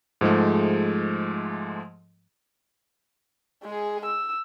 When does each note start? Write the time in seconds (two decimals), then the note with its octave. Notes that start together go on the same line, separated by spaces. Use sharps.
0.21 G#2 F3 G#3 A3
3.63 G#3 G#4
4.06 E6